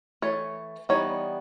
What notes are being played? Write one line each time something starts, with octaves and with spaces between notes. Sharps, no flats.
E3 A3 C#5
E3 G3 B3 D#4 C#5